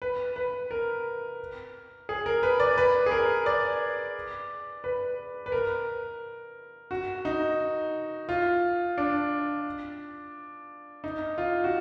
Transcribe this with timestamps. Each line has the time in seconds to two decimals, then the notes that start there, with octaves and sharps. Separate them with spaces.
0.02 B4
0.36 B4
0.71 A#4
2.09 G#4
2.26 A#4
2.43 B4
2.60 D5
2.78 B4
3.06 G#4
3.11 A#4
3.46 D5
4.84 B4
5.46 B4
5.52 A#4
6.91 F#4
7.25 D#4
8.29 F4
8.98 D4
11.04 D#4
11.38 F4
11.64 F#4